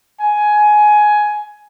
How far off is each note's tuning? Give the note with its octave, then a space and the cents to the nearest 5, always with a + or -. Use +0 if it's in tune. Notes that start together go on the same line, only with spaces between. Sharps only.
G#5 +15